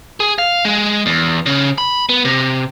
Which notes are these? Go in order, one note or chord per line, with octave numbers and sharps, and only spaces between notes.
G#4
F5
G#3
E2
C#3
B5
B3
C3